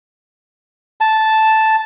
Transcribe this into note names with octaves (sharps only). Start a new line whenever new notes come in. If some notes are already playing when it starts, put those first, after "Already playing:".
A5